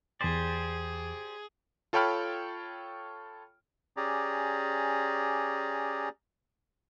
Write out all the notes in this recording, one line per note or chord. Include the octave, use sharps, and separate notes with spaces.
E2 G4 G#4 C5 D5 A6
F4 A4 C#5 G5 B5 F6
C#4 G4 G#4 D5 A#5